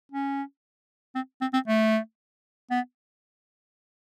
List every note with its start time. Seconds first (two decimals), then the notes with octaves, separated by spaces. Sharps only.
0.12 C#4
1.15 C4
1.41 C4
1.53 C4
1.67 A3
2.71 B3